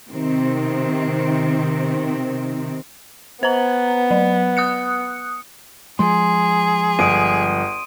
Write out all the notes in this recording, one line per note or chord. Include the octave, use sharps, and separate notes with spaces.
C3 D#3 C4
B3 C5 A#5
F#3
D#6 F#6 C#7
F3 G#3 G#4 C6
G1 D#6 D7 D#7